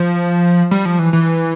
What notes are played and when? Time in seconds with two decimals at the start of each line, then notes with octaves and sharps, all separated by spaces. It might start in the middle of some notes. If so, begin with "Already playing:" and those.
Already playing: F3
0.71 G3
0.85 F3
0.99 E3
1.13 E3